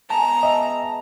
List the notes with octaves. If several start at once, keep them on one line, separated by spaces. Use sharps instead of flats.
G#3 B3 G#4 A5 A#5
D#5 E5